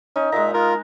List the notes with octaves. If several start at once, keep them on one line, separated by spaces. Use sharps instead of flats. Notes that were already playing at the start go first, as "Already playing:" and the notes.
C#4 D#4
A#2 G#3 E5 A#5
F4 A#4